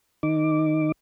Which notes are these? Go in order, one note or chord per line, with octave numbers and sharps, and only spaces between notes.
D#3 D#4 D6